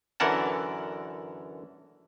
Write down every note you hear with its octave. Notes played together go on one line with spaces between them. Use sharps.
F#2 D3 E3 A#4 F#5 A5